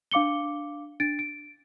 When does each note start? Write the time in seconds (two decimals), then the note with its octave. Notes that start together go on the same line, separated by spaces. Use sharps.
0.11 D4 F5 D6 C#7 G7
1.00 D4 A6 D7
1.19 D7